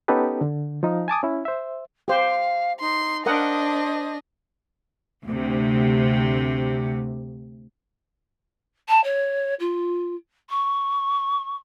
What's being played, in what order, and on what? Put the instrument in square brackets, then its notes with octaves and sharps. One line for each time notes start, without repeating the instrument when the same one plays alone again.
[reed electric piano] B3 C#4 D#4 G4 A4 B4
D3
F3 D#4
G#5 A5 D6 D#6
C#4 E4
C5 E5
[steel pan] G4 C5 [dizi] F5
[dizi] D#4 [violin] C6
[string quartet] D4 [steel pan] A#4 F#5 D#6 [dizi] C5 [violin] D#5
[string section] D2 C3
[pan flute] A5
C#5
F4
C#6